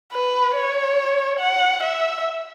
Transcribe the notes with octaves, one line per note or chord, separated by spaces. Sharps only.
B4
C#5
F#5
E5